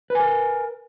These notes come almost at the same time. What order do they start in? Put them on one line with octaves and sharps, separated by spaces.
B4 G#5 A#4